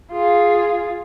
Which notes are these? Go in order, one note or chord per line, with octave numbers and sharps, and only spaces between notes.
F4 G#4